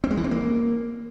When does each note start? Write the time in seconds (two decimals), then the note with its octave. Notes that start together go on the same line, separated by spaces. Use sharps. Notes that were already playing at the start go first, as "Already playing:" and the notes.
0.04 C4
0.11 G#3
0.17 E3
0.24 C4
0.31 A#3